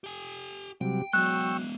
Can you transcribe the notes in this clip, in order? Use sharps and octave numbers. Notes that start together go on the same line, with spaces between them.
G4 G#5
C3 F#3 G3 G4 G5
F#3 G#3 B3 G5 C#6 E6 F#6